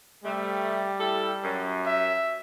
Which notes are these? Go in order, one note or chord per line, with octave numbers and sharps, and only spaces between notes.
C3 G3 A3
E4 G4 A4
F#2
E5